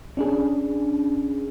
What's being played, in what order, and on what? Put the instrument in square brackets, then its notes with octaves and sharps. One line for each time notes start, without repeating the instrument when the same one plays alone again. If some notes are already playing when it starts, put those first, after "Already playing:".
[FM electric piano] C#4 D4 G#4